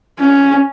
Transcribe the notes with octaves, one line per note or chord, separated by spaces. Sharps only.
C#4